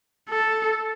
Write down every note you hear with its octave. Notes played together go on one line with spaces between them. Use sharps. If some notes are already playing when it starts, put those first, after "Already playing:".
A4